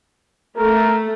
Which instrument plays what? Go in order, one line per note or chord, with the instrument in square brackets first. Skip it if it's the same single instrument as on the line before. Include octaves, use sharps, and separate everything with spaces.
[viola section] A3 [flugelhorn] A#4